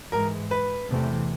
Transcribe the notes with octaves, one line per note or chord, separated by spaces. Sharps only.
G#2 E3 G#3 A#4
B4
E2 C3 E3 A3